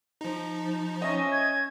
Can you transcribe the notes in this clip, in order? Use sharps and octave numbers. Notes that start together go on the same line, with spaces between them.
F3 D#4
C#4 D#5 E5 A#6
G#6